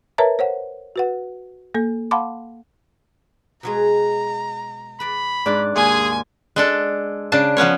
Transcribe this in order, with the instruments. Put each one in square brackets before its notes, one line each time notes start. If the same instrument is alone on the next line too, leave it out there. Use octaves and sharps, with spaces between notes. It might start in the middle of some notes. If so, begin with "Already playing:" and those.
[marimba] A#4 B4 C#5 E5 A5 A#5
C5 C#5 F#5
F#4 B4 F#5
A#3 A4
F5 F#5 A5 B5 C6 D6
[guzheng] B2 F#3 G#3 [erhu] A#5
[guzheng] B4 D5 [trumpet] B5
[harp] G#2 D5 F#6 [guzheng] D4 B4
[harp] D#2 G#2 C6 [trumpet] G#4 [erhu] G#5
[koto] G#3 D4 A4
C#3 D4 A5
F3 B3 C#4 C#5